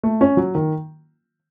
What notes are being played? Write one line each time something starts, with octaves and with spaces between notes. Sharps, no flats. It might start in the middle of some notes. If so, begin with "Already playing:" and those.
A3
C#4
F#3
D#3